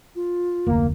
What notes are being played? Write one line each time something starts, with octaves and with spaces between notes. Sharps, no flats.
F4
F1 D2 A#3